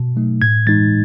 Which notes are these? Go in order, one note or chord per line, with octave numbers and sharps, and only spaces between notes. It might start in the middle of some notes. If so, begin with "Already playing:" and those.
Already playing: B2
F#3 A3 D#4
A2 G#6
E3 G#3 D#4 A6